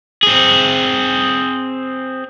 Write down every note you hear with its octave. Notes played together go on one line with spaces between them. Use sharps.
C4 G#4